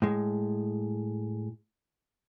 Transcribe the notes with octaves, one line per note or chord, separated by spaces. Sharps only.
A2 G#3